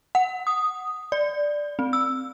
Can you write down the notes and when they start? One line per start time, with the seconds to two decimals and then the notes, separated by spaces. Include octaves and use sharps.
0.15 F#5
0.47 D#6
1.12 D5
1.79 C4
1.93 E6